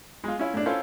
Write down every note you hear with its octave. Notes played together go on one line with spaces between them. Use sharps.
G#3 F4
C#4 E4 F4
A2 D4
C#4 E4 F4 A4 C5